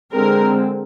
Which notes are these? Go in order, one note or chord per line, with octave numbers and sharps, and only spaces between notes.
D3 G#3 C4 A#4